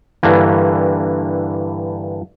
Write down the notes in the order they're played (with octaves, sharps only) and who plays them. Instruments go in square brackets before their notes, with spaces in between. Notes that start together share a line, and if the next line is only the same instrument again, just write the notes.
[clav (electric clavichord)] G2 D3 E3 A#3